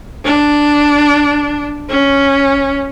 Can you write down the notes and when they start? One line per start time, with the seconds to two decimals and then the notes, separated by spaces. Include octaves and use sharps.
0.25 D4
1.89 C#4